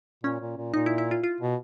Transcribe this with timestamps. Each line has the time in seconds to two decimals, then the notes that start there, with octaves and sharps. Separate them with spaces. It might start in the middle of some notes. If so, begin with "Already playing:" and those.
0.23 A#2 C#4
0.41 A#2
0.57 A#2
0.74 A#2 D#4
0.86 E4
0.98 E4
1.11 F4
1.24 F4
1.41 B2